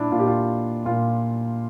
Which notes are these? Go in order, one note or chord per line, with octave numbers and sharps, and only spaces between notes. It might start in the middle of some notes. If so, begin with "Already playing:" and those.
Already playing: A#2 D4 E4
A#2 F4
G4
F4
A#2 F4